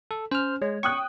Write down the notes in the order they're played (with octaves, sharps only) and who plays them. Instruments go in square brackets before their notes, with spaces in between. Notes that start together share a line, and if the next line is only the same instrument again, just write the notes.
[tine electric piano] A4
[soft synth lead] C#4 [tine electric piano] C5 F6
[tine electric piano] G#3 [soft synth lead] C#5
[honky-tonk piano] G5 D#6 F#6 [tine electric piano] C#6